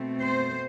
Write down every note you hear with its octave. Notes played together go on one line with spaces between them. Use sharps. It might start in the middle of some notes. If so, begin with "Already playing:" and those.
Already playing: B2 A3 C4
C5